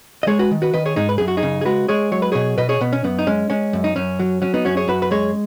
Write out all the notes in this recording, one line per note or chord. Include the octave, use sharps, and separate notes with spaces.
D#5
G#3 G#4 C#5
F#4 B4
D#3
F#4 B4
D#3 B4 D#5
G#4 C#5
G#2 D#4 G#4
B4
F#2 G#4
F#4
D#4 G#4
C#3
G#4
G#3 F#4 B4
G#3 G#4 C#5
F#3 C#5
B4
B2 G#4 C#5
B2 B4 D#5
G#4 C#5
B2 B3
C#4
F#2 B3
D#4
G#3 C#4
G#3 C#4
F#2
D#4
F#2 C#4
F#3
F#3 C#4
B3 D#4
F#2 C#4 F#4
G#4 C#5
F#2 F#4 B4
B4
G#3 G#4 C#5